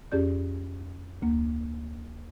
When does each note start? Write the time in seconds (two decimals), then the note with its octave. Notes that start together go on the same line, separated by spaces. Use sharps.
0.12 F2 C#4 G4 G#4 D5 G6
1.22 D2 A#3